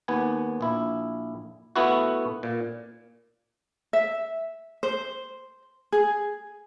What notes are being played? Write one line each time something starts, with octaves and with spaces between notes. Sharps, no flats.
D#2 B3 G#5
A#1 E4
A3 B3 E4 F#4
A#2
E5
C5
G#4